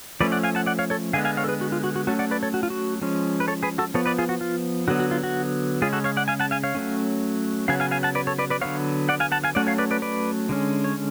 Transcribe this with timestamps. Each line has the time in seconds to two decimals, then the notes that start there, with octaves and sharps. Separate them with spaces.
0.20 F3 A3 C#4 B4 D5
0.32 D5 F#5
0.43 F5 G#5
0.55 F#5 A5
0.66 D5 F#5
0.79 C#5 F5
0.90 A4 C#5
1.13 D3 G#3 B3 F5 G#5
1.25 F5 G#5
1.37 C#5 F5
1.44 A4
1.48 G#4 B4
1.61 F#4
1.72 F4
1.84 F#4
1.96 F#4
2.07 F#3 A3 C#4 F#4 A4
2.19 D5 F#5
2.31 B4 D5
2.43 A4 C#5
2.54 F#4
2.63 F4
2.70 F#4
3.02 F3 G#3 C#4
3.40 B4
3.48 A4 C#5
3.63 G#4 B4
3.78 F#4 A4
3.94 F3 B3 A4 C#5
4.06 B4 D5
4.18 F4 G#4
4.29 F#4
4.41 F4
4.88 D3 F#3 B3 F#4
5.00 F#4
5.11 F4
5.24 F#4
5.82 C#3 G#3 C#4 F4 G#4
5.93 F#4 A4
6.04 C#5 F5
6.17 D5 F#5
6.28 F5 G#5
6.40 F#5 A5
6.51 F5 G#5
6.63 C#5 F5
6.75 F#3 A3 C#4
7.68 C#3 F#3 B3 F5 G#5
7.80 F5 G#5
7.91 F5 G#5
8.03 F#5 A5
8.15 B4 D5
8.27 A4 C#5
8.39 B4 D5
8.50 B4 D5
8.61 D3 F#3 B3 C#5 F5
9.09 D5 F#5
9.20 F5 G#5
9.32 F#5 A5
9.44 F5 G#5
9.55 F#3 A3 C#4 D5 F#5
9.67 C#5 F5
9.78 B4 D5
9.91 B4 D5
10.02 B4 D5
10.49 D3 G#3 C#4
10.84 C#5